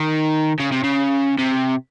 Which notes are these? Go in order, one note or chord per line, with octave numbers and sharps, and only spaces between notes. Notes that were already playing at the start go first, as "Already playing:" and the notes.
Already playing: D#3
C#3
C3
C#3
C3